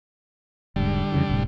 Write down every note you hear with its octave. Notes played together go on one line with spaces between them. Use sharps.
E1 G#2 D3 G3
F2 C#3 E3
D1 A2 C3